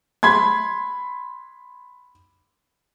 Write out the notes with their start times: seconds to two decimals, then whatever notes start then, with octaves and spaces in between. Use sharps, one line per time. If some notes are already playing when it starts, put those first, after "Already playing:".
0.23 B5 C6 G#6